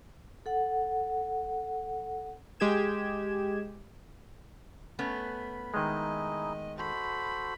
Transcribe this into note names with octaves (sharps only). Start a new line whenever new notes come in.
A4 F#5
G#3 G4 G#4 G#6 E7
A3 B3 C#4 B5
D#3 G#3 D#4 E4 G#4 D#5
F#4 A4 C5 B5